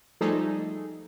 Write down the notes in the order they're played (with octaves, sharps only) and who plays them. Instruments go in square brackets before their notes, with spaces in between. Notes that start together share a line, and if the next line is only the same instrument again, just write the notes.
[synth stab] F3 G3 A3 D#4 G#4 A4